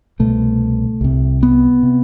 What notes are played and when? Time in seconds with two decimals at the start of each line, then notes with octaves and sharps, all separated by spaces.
0.19 C2 B2 A3
1.01 C2 C3
1.43 B3
1.83 C3